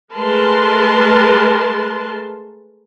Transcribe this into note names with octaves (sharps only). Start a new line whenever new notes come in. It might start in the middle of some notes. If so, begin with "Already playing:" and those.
G#3 A3 A#4 B4 A5 C6